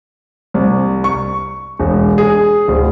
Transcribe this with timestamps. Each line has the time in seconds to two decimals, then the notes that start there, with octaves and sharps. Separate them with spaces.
0.54 C2
1.04 C#6
1.79 E1
2.18 G#4
2.68 D1